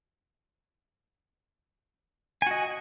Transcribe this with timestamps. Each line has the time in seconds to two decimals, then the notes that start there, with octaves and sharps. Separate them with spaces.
2.42 G#5
2.47 F#4
2.51 D#5